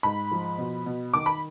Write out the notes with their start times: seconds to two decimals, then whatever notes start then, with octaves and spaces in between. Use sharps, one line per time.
0.03 G#2 B5
0.31 F3
0.58 B2
0.86 B2
1.14 D#3 D6
1.26 B5